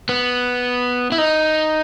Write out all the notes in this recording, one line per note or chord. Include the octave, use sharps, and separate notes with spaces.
B3
E4
D#4